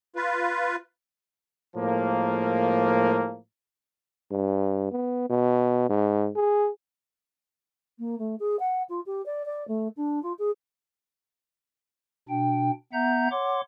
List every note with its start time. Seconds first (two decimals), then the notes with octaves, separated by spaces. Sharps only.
0.16 F4 B4
1.76 A2 F3 G#3 A#3
4.31 G2
4.91 B3
5.30 B2
5.90 G#2
6.36 G#4
7.99 A#3
8.18 A3
8.39 G#4
8.59 F#5
8.89 F4
9.06 G4
9.26 D5
9.45 D5
9.68 A3
9.96 D4
10.23 F4
10.39 G#4
12.29 B2 D4 G5
12.93 B3 E5 F#5 A#5 G6
13.31 C#5 F#5 C6 D6